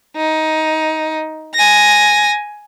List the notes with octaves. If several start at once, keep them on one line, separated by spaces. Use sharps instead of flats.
D#4
G#5 A#6